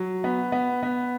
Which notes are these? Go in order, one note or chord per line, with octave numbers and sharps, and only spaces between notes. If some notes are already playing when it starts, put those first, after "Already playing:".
Already playing: F#3
B3
B3
B3